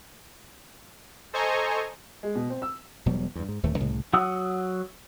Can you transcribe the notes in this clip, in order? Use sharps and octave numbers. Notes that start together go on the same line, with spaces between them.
A4 C5 D#5 G#5 A#5 C#6
G#3
B2
C4
E6
E1 B2 F#3 G3
E2 G2
G#2
D1 D#2 A3
C2 A2 C#3
F#3 F#5 D#6 E6